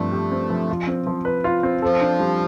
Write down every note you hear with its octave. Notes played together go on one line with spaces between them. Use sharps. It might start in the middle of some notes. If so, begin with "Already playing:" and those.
Already playing: G2 F3 A3 C4
G4
C4
F3
F4
C4
F3
B4
F4
C4
F3 A4
D4
G3